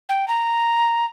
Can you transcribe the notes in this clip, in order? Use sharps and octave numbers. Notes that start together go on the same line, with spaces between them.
G5
A#5